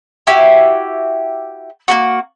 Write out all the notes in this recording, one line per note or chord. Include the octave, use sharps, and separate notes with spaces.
E4 F#4 G4
A#3 B3 F#4